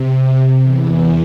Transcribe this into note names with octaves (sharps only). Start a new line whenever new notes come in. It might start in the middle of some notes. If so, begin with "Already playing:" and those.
Already playing: C3
E2 E3